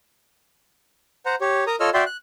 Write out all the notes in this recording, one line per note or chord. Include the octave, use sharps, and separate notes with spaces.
C5 F#5 A#5
G4 C#5
A#4 A#5 D#6
F4 A4 C#5 D#5 E6 F6
F#4 D5 E5 G5 C6
F#6